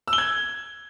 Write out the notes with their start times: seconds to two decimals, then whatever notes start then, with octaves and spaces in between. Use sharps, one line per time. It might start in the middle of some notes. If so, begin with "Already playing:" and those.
0.08 E6
0.13 G7
0.18 G#6